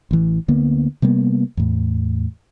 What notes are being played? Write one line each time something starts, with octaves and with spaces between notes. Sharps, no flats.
A1 E3
D2 D3 A#3 B3
C3 G3 A#3 B3
E2 A2